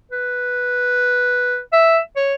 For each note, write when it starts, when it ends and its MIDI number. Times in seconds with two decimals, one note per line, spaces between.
0.11 1.60 71
1.73 1.99 76
2.16 2.35 73